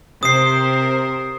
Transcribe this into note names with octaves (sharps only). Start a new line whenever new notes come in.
C3 A#4 C5 D#6 C7